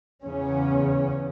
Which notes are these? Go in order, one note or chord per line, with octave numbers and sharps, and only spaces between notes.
E2 C#3 C#4